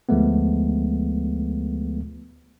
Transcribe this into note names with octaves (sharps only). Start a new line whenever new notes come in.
D2 F3 G#3 A3 B3